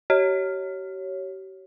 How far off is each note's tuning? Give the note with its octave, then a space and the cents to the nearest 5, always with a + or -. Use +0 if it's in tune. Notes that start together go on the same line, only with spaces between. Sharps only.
G4 -40 C#5 +0